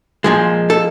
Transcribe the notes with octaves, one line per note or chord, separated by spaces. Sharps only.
A#2 F3 G#3
A4